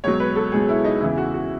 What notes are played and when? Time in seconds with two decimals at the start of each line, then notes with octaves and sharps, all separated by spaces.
0.04 C#2 B2 F#3 C#5
0.20 B4
0.36 A4
0.52 C#2 B2 F#3 G#4
0.69 E4
0.84 D#4
1.01 E2 C#3 E3 E4
1.17 F#4
1.34 F#4